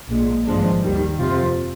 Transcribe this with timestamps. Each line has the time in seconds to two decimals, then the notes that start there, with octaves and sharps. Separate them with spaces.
0.10 A#1 A#2 G#3
0.47 G#1 G2 F3 G#3 D4
0.83 D#2 D#3 G3
1.18 F2 C3 F3 C4 F4